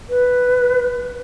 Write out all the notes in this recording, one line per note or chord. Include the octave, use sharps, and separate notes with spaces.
B4